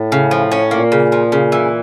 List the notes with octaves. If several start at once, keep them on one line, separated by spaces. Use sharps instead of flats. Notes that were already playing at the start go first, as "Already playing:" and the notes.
Already playing: A2
C#3
F3
C#4
A#2 A#3
C#3
F3
C#3
E3